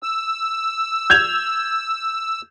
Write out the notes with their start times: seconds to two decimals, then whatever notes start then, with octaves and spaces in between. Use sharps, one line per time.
0.03 E6
1.10 G6 G#6 F7